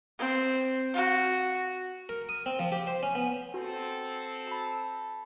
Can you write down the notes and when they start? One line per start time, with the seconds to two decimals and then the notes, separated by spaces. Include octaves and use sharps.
0.19 C4
0.94 F#4
2.09 A#4
2.29 D#6
2.46 C4
2.59 F3
2.72 G4
2.87 C5
3.03 C#4
3.15 B3
3.54 C4 F#4 A4
4.48 A5 B5